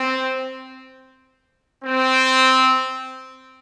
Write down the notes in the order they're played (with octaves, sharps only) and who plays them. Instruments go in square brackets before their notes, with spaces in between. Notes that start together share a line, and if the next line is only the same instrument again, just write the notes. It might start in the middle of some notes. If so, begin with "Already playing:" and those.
Already playing: [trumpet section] C4
C4